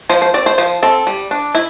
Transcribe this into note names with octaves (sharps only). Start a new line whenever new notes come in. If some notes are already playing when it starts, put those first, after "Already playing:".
F3 C5
C5
C4 D5
C5
F3 C5
C4 A4
G3
D4
E4